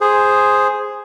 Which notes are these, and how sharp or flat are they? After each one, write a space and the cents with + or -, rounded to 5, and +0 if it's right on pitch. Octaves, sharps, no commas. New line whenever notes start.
G#4 +0 C5 +0